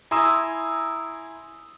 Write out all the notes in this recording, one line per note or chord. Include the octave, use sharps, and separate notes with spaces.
E4 G#5 A#5 C6 D#6 E6